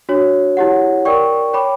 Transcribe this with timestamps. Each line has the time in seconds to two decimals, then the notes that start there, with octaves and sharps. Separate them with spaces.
0.09 D4 F#4 C#5
0.57 E4 G4 C#5 F#5
1.05 A#4 D5 G5 C#6
1.53 C#5 G5 B5 D6